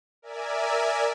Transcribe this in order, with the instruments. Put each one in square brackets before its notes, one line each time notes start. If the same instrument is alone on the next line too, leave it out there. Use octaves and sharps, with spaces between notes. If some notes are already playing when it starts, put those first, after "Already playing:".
[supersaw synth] A#4 D5 E5 G#5